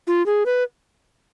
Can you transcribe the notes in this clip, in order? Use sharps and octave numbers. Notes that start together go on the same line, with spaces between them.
F4
G#4
B4